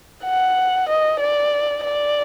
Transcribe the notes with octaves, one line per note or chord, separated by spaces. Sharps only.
F#5
D#5
D5
D5